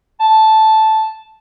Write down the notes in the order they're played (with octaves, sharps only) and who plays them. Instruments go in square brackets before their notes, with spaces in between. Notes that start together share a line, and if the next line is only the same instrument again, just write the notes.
[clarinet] A5